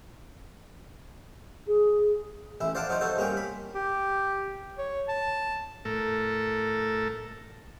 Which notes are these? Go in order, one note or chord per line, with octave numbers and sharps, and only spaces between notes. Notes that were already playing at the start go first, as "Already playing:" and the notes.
G#4
A1 E4
C5 D5 F5 F#5 A5 D6
F#3 D#4 F4 C5
D#4 F#4 A4 C5
G2 A#3 C#4 G5
B5
G4
C#5
A5
A2 A3 A4 A#4